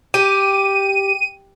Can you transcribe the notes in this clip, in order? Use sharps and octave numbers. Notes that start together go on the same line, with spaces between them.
G4 D#7